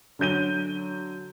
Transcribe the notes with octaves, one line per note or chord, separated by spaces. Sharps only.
D3 F#3 G6 D#7 G7